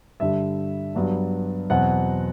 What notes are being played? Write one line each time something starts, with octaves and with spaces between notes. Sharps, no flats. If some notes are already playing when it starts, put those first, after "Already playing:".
G2 D3 G3 E5
G2 F#3 B3 D4
E2 B2 F#3 C4 F#5